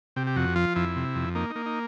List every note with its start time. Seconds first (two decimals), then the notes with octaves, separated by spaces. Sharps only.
0.16 C3 G4
0.27 G4
0.36 F2 F#4
0.56 F3 F4
0.76 F2 E4
0.96 C3
1.15 F2
1.35 A#3 D#4
1.50 D#4
1.56 A#3
1.66 D#4